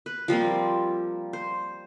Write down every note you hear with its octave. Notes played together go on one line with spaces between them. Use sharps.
B4
F3 G3 A#3 C4
C5